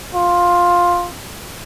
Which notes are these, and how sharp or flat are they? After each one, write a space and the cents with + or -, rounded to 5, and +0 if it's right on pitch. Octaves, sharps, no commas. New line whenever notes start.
F4 +10